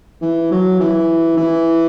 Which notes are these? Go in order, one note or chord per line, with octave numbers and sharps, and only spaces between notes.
E3
F#3
E3
E3